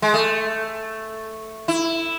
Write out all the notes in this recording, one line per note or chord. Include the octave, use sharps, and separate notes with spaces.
G#3
A3
E4